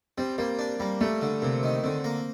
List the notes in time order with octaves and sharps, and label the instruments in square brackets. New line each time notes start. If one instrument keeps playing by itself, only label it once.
[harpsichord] G3 [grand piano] C4
[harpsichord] G3 [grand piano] A#3
[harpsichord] D4
[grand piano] G3 [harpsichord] A#3
[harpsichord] G3 [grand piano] A3
[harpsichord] D3
[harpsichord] C3 [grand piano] A#3
[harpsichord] D#3
[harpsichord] D3 [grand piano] C4
[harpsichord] A#3